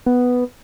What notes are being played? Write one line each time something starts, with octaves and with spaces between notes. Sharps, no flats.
B3